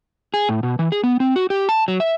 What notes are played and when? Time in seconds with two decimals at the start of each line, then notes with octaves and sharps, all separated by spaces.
0.34 G#4
0.49 A2
0.63 B2
0.79 E3
0.92 G#4
1.04 B3
1.20 C4
1.36 F#4
1.50 G4
1.69 A5
1.88 F#3
2.00 E5